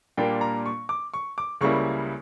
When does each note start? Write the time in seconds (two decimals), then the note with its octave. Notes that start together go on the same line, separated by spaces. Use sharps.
0.17 A#2 G3 A#3 D4 F4 G5
0.41 A#5
0.66 C#6
0.89 D6
1.14 C#6
1.38 D6
1.61 C#2 C#3 G3 A#3 E4 C#6